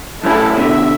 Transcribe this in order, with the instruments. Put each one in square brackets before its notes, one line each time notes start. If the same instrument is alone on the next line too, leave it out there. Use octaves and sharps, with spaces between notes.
[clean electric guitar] F#2 A3 C#4 [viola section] E4 A4 A5
[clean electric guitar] B2 D3 [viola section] E5